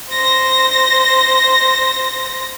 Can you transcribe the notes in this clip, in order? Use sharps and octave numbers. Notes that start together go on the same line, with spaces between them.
C5 A#6